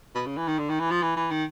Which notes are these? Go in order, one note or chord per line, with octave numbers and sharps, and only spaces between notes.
B2
C#3
E3
D#3
D3
D#3
E3
F3
E3
E3
D#3